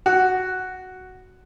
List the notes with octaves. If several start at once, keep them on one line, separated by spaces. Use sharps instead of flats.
F#4